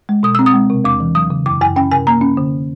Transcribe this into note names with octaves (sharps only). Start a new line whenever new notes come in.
G#3
B2 D#6
C4 E6
D#6
G#3
C3
E2 D6
E3
F#3 D#6
C#3
F#2 D6
F#2 G#5
C#4 G5
C3 G#5
A#3 A#5
C#4
D3